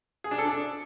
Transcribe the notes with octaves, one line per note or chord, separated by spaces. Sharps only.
G#4
D4
A4
D4